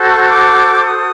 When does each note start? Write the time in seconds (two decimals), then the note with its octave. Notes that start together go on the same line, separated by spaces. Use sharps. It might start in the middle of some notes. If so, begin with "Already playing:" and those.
Already playing: F#4 A4 C5
0.09 C#6
0.28 D6
0.84 D#6